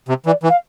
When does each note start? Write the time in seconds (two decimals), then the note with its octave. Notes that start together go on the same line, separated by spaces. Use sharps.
0.08 C3
0.26 E3 D5
0.43 E3
0.49 F5